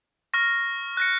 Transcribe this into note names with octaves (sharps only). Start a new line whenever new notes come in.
C#6 F6 A#6
F#6 A#6 C#7